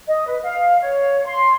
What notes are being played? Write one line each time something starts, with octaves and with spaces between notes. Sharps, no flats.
D#5
B4
F5
C#5
C6